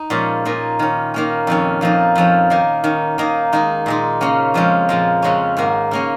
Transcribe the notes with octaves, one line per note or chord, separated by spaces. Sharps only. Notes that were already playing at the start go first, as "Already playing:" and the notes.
Already playing: D#4
A#2 F3 G#3 C#4
A#2 A#3 D#4
D#3 C#4
D#3 A#3 C#4
F2 D#3 C#4
F2 F3 A#3 D#4
F2 F3 C#4
D#3 A#3 D#4
D#3 C#4
D#3 A#3 D#4
D#3 G#3 D#4
A#2 G#3 D#4
C#3 A#3 C#4
F2 F3 G#3 C#4
A#2 F3 G#3
F2 C#3 G#3 C#4
G#2 D#3 A#3
C#3 A#3 C#4